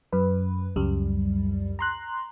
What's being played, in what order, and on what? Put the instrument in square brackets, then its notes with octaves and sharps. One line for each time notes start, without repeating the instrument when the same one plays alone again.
[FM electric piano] F#2 B4
C#2 F#2 G3
A#5 C6 F#6